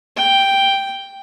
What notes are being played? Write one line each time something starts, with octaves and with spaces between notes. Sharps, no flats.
G5